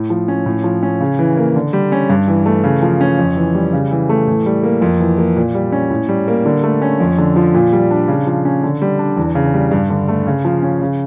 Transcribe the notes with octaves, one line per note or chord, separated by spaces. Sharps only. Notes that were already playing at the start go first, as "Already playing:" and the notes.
Already playing: A2
F3
C#4
A2
F3
C#4
C#3
E3
A#3
D3
G3
C#4
G2
E3
A3
C#3
F3
C#4
F2
E3
G3
C#3
E3
A3
A2
G3
A#3
F2
E3
A#3
A#2
G3
C#4
A2
G3
A#3
D3
A3
C#4
F2
D3
F3
A#2
G3
D4
C#3
F3
C#4
D3
G3
D4
E2
C#3
G3
G2
D3
A3
C#3
F3
C#4
C#3